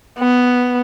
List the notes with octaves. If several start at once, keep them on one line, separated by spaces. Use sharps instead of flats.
B3